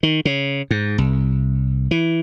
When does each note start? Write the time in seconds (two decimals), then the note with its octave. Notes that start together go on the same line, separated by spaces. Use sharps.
0.03 D#3
0.25 C#3
0.71 G#2
0.98 C2
1.91 E3